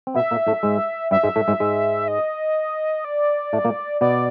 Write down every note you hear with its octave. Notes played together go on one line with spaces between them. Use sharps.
C4
B2 B3 E5
A#2 A#3
A2 A3
G#2 G#3
G2 G3 E5
G#2 G#3
A2 A3
G#2 G#3
G#2 G#3
D#5
D5
A2 A3
A#2 A#3
B2 B3 D5